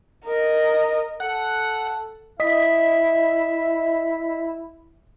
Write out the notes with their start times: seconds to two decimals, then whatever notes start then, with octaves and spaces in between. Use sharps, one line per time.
0.25 A#4 D#5
1.20 A4 F#5
2.40 E4 D#5 E5 B6